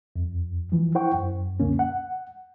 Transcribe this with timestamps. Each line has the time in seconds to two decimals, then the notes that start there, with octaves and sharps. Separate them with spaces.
0.16 F2
0.72 E3 F3
0.95 E4 C5 F#5 G5 C#6
1.14 F#2
1.60 C#2 F#2 B2 D3 A#3 C#4
1.79 F#5